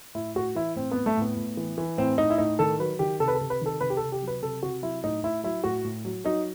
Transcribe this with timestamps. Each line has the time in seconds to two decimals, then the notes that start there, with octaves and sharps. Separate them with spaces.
0.15 A2 E4
0.35 A2 F#4
0.55 E3 E4
0.76 A2 C4
0.91 B3
0.97 A2
1.06 A3
1.17 A2 B3
1.37 A2
1.57 E3
1.78 E3
1.98 A2 C4
2.18 A2 D#4
2.30 E4
2.38 A2 D#4
2.59 D#3 A4
2.79 F#3 B4
2.99 D#3 G4
3.20 C3 A4
3.28 B4
3.35 A4
3.41 C3
3.50 B4
3.61 D#3 A4
3.81 C3 B4
3.90 G4
3.97 A4
4.02 C3
4.12 G4
4.22 F#3
4.27 B4
4.42 C3 A4
4.63 C3 F#4
4.82 F#3 E4
5.04 A2 D#4
5.23 A2 E4
5.43 F#3 E4
5.64 A2 F#4
5.84 A2
6.05 F#3
6.24 F#3 D#4